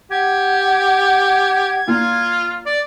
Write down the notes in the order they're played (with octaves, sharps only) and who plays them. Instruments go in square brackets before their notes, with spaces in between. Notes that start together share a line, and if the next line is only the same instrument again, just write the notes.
[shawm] G4 [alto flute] F#5 [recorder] G#6
[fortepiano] A#2 [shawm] F4
[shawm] D5